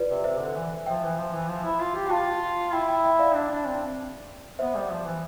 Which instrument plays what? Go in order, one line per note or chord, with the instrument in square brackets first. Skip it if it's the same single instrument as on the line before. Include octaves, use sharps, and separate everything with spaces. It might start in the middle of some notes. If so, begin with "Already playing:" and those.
Already playing: [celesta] F4 B4 D5
[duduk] C3
[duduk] C3 [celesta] C5 E5
[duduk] D3
E3
[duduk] F3 [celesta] E5 G5
[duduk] E3
F3
E3
F3
E4
F4
G4
[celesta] G5
[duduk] F4 [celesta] F5 A5
[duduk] E4 [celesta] G5 B5
[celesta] G5 B5
E5 G5
D5 F5
[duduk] D4
D4
C4
[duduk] B3 [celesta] C5 E5
[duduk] G3
F3
E3